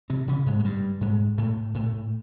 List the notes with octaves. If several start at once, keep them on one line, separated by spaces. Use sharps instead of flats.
C3 C4
C#3 C#4
G#2 G#3
G#3
G2 G3
G#2 G#3
A2 A3
A2 A3